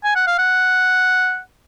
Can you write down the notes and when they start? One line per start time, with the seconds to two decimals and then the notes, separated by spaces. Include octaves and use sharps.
0.04 G#5
0.15 F#5
0.27 F5
0.38 F#5